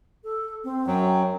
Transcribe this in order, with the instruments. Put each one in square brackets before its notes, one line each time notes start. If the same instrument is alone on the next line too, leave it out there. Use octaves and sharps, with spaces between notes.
[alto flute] A4
C4
[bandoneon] F#2 F#3 [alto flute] G5